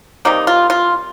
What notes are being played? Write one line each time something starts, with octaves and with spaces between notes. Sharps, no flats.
C3 G3 A#3 D#4
F4
F4